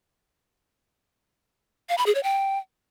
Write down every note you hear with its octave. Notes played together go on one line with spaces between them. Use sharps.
F5
B5
G#4
C#5
G5